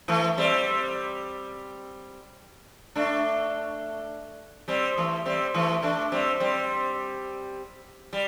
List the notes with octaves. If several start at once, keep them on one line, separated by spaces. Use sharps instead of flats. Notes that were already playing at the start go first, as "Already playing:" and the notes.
E3 A3
G3 C4
A3 D4
G3 C4
E3 A3
G3 C4
E3 A3
A3 D4
G3 C4
G3 C4
G3